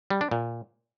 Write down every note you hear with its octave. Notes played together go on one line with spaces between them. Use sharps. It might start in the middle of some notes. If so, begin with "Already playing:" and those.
G3
D4
A#2